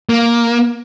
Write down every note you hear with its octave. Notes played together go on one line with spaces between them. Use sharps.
A#3